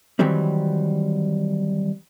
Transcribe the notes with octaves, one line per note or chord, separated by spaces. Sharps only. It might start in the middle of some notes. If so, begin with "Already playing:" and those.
D#3 E3 F#3 G3 C4